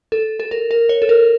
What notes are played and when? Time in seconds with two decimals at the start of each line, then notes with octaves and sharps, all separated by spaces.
0.12 A4
0.40 A4
0.51 A#4
0.71 A#4
0.89 C#5
1.02 A4
1.09 A#4